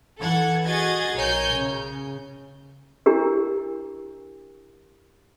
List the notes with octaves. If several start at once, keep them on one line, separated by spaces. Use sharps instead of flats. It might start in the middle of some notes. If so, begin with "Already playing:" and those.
E3 A4 F#5 G#6
F#4 G#4 D#5 G#6 A6
B1 A#4 C#5 G#5 G6
C#3
D4 E4 G4 A#4